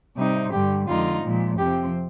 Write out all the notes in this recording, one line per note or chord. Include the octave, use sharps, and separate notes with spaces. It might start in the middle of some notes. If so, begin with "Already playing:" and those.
C3 G3 C4 D#4
G2 D3 G3 G4
F2 D3 G#3 D#4 F4
A#2 F3 G#3
F2 C3 F3 C4 G4